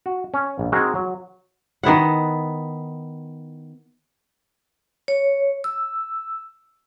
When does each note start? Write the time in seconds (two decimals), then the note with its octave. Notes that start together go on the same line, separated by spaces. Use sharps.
0.06 F#4
0.34 C#4
0.59 A#1
0.72 G#3 C4 D#4 F#4 G#4 A#4
0.95 F#3
1.83 D#3 B3 E4 F#5
5.08 C#5
5.64 E6